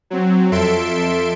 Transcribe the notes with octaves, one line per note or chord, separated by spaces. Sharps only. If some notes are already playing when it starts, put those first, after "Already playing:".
F#3 C4
F2 A4 E5 C6 D7